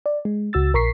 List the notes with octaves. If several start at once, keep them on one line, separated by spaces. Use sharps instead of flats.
D5
G#3
C#2 F#4 E6 A6
A#1 A#4 A#5 C#6 B6 C7